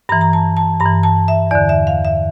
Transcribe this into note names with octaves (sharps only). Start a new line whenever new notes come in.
G2 E3 A#5
A#5
A5
A5
G2 A#5
E3
A5
E5
E2 D3 D5
E5
F5
E5